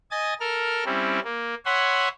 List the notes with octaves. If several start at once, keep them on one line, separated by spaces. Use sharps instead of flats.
D#5 G#5 D#6 A6
A4 A#4 F6
G3 C4 C#4 E4
A#3
C#5 E5 F#5 G#5 B5 C6